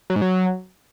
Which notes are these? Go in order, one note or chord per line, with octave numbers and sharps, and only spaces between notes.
F#3
G#2
F#3